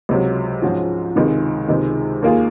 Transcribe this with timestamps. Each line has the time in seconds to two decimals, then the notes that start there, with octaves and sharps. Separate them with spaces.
0.09 C#2 C3 F#3
0.62 G#2 F3 G#3 C#4 F#4
1.16 C#2 C3 D#3 G#3 C4
1.68 C#2 C3 D#3 G#3
2.22 D#2 D#3 A#3 F4 G#4